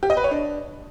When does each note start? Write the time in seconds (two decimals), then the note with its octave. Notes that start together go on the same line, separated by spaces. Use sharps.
0.03 G4
0.10 D#5
0.17 B4
0.24 C#5
0.31 D4